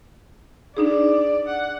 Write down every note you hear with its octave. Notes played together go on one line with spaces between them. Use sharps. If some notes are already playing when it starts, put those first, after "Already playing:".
D4 D#4 G#4 D5
F#5